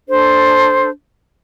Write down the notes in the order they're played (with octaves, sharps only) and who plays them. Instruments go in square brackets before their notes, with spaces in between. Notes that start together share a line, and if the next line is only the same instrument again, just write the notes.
[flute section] D4 A4 C5